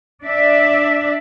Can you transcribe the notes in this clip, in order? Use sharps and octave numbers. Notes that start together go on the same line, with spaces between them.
D4 D5 E5